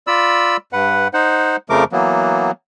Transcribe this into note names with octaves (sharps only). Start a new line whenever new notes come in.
F4 D5 B5 E6
G2 B4 F#5
D#4 C5 F#5
F2 C#3 F3 A3 A#4 D6
E3 F#3 A#3 B3